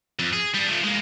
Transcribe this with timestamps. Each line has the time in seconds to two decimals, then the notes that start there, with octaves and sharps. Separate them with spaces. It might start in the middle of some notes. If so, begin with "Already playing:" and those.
0.19 F2
0.33 G#4
0.54 G3 D4
0.68 F3 A3
0.84 G#3 A#3